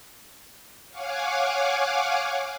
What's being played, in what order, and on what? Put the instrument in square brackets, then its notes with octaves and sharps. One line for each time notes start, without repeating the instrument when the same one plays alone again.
[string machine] C#5 F5 F#5 G#5 D6